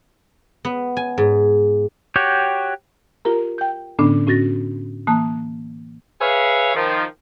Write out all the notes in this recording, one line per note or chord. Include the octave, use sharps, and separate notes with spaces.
B3
G#5
G#2
F#4 G4 C#5 G5
F4 G4 A#4 A#5
G5 G6
A2 D3 B3 C#4 D4
A2 C#4 F#4 A6 A#6
E3 A#3 A5 D#6 F#6
G#4 B4 C#5 E5 F5
D#3 F3